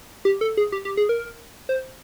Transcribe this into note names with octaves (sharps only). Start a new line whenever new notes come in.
G4
A4
G#4
G4
G4
G#4
A#4
C5